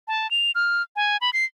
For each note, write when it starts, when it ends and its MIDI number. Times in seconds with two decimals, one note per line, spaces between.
0.08 0.30 81
0.31 0.51 101
0.55 0.82 89
0.96 1.17 80
1.21 1.30 83
1.33 1.45 96